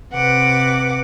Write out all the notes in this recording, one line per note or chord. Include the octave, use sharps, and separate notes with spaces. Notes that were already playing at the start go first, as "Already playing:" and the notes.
C3 B4 F#5 D6